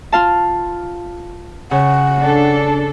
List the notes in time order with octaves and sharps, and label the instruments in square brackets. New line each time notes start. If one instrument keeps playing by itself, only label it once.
[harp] F4 F5 A5
[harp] C#3 [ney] F#5
[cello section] D4 A4